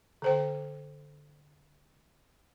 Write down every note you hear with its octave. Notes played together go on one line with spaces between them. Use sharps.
D3 C5 G5